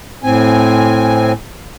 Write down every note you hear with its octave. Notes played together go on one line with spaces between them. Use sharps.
A2 C4 G#5